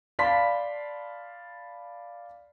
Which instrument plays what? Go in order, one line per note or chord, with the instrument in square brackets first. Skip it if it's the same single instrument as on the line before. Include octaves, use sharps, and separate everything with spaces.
[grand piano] D5 F5 A5 B5 C6 B6